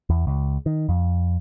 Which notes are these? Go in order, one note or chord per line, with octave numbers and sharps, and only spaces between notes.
E2
C#2
D#3
F2